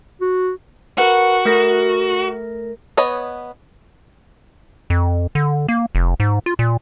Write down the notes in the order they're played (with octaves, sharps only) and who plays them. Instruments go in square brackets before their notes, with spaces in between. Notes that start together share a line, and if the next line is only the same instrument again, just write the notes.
[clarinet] F#4
[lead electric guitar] F#4 [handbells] A#4 B4 F#5
[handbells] A3 A#4 A#6
[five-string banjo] B3 B4 C#5 D#5
[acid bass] F2
D3
A#3
F1
G#2
F4
A#2